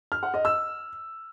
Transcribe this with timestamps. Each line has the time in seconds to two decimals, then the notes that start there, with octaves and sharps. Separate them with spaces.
0.12 F6
0.23 F#5
0.34 D#5
0.45 E6